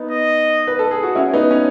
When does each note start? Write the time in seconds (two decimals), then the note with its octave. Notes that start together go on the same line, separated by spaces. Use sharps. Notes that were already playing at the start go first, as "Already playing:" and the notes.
Already playing: B3 D#4
0.10 D#5
0.67 B4
0.79 A4
0.91 G#4
1.03 F#4
1.15 C#4 E4
1.33 B3 D#4
1.51 C#4